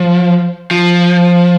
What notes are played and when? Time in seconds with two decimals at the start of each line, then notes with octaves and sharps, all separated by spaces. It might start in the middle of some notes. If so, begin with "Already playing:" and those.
Already playing: F3
0.71 F3